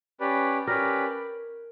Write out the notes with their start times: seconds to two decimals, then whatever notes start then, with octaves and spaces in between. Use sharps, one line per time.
0.20 C#4 G4 B4 D5
0.67 C#4 G4 A#4 B4 D5